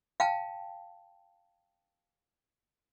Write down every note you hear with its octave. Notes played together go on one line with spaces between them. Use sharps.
F5 G5 A5